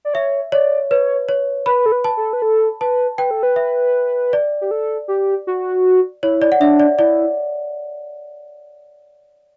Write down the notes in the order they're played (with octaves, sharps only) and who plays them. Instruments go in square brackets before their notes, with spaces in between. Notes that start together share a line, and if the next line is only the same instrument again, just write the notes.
[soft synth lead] D5
[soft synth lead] C#5 [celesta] E5
[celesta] C#5 [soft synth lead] D5
[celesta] B4 [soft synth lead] C#5
[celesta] C#5
[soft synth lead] B4 [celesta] B5
[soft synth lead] A4
B4
[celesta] A5
[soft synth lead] A4
B4
A4
[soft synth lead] B4 [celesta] A5
[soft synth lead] B4 [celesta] G5
[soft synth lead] A4
B4
[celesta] E5
D5
[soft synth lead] G4
A4
G4
F#4
[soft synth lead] E4 [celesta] C#5
[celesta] D5
F#5
[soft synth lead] D4 [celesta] E5
[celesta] D5
[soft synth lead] E4 [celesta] D5